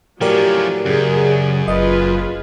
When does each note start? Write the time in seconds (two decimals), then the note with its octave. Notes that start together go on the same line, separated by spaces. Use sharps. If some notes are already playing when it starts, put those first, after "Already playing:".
0.21 A2 F3 F#3 C#4 G4 A#4 D5
0.85 F#2 C#3 G#4
1.23 C#3
1.68 F#1 F4 G#4 B4 D#5